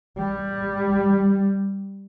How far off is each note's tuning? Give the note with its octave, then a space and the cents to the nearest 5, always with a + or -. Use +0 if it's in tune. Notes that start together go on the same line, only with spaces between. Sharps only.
G3 +5